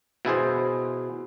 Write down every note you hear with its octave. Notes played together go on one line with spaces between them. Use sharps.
B2 E4 G#4 C5